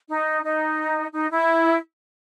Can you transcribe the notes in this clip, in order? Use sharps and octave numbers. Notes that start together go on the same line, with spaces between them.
D#4
D#4
D#4
E4